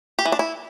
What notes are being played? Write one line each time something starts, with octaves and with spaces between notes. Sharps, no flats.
G4
E3
D4
E4